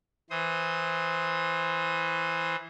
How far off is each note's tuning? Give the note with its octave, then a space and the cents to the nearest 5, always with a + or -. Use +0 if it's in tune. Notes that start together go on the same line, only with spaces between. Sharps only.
E3 +0 C5 +0 D#6 +25